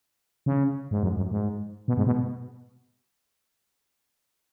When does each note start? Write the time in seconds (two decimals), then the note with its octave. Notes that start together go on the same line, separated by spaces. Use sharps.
0.46 C#3
0.91 G#2
1.03 F#2
1.17 F#2
1.31 G#2
1.88 B2
1.97 G#2
2.06 B2